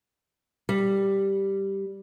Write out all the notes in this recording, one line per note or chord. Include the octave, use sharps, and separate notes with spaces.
G3